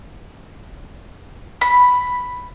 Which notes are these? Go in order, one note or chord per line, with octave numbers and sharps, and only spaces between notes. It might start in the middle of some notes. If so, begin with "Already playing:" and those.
B5